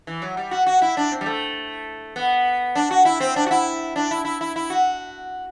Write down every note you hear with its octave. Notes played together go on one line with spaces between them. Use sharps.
E3
F#3
G3
F#4
F#4
E4
D4
C4
G3
A3
B3
D4
F#4
E4
C4
D4
F#4
E4
D4
E4
E4
E4
E4
F#4